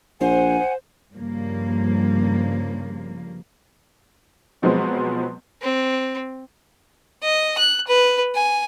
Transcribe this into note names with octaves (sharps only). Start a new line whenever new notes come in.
A#1 C5 F#5 G#5
C5
G2 C#3 F3 G3 A#3
B2 F3 F#3 G#3 B3 C4
C4
D#5
F#6
B4
G#5